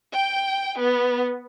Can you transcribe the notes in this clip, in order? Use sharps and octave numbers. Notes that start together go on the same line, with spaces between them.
G5
B3